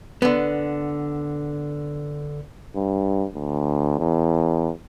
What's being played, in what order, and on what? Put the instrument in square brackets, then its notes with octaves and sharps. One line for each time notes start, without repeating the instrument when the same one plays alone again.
[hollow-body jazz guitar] D3 B3
[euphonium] G2
D2
E2